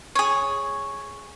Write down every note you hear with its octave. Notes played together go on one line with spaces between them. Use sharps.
G#4 C#5